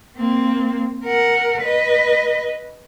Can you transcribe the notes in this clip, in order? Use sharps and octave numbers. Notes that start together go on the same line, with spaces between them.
A#3 C4
A#4 F#5
B4 D#5